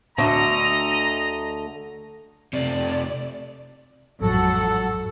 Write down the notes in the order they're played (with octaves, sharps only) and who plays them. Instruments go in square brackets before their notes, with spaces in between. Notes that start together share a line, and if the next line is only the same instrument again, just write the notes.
[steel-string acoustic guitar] D2 D3 A3 [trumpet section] D#5 A#5
[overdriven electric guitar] C3 A3 [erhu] D5
[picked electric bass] A1 G#2 [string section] F2 F#3 F#5 [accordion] A4